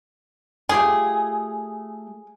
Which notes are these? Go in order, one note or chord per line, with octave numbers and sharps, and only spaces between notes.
A3 F4 G4 G#4